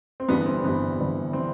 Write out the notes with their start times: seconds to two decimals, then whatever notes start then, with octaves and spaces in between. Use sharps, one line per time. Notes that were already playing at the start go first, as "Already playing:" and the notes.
0.20 C4
0.28 G1 G2 E3 B3
0.46 C4
0.64 G1 G2 E3 B3
0.99 G1 G2 E3
1.33 E3 C4